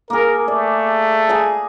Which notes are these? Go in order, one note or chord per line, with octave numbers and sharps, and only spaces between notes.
A#3 G#4 A#4
A3 D5
G#4 G#5 A#5